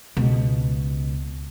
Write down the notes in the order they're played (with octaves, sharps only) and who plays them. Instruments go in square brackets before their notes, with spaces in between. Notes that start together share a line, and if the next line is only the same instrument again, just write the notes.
[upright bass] C#2 B2